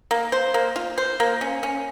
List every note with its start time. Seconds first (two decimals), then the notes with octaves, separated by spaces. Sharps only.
0.11 A#3
0.32 C5
0.54 A#3
0.76 F4
0.98 C5
1.20 A#3
1.41 C#4
1.63 C#4